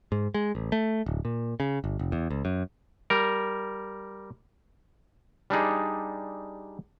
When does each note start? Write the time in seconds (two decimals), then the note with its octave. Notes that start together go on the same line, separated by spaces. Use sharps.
0.12 G#2
0.34 G#3
0.55 A1
0.72 A3
1.06 D1
1.25 A#2
1.60 C#3
1.84 G1
1.99 F1
2.12 E2
2.30 C#2
2.45 F#2
3.10 G3 A#4
5.50 G3 D4 D#4 G#4